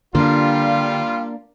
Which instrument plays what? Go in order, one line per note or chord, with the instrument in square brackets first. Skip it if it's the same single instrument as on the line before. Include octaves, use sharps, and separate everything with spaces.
[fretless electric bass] D3 [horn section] G3 F4 [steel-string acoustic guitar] A#3 D4